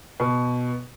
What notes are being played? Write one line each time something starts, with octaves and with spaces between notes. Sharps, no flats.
B2